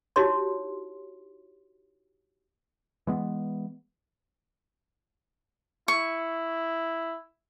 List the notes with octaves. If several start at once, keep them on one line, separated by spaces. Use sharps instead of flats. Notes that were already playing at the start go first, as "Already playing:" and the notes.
D#4 E4 F#4 G4 C#5 C6
E3 G#3 B3
E4 C#6